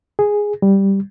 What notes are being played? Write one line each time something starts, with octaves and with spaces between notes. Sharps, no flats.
G#4
G3